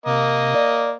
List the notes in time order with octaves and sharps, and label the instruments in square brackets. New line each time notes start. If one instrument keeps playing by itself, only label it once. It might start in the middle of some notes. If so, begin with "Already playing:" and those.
[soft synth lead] C3 [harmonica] A#3 D#5
[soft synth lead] D5